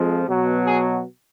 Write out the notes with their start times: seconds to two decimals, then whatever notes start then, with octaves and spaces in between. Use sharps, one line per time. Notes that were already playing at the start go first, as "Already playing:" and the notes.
Already playing: F2 F3 G#3
0.28 B2 F#3
0.66 G#4